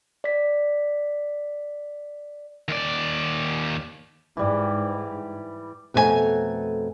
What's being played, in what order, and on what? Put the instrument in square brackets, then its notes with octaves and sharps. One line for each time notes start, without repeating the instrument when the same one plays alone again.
[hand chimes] D5 B6
[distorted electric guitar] D#2 D5
[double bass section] G#2 [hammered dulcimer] E3 G3
[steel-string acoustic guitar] F2 B2 A3 F4 G#5 A#5